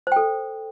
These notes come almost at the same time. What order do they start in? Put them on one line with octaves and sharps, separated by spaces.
C5 G5 A4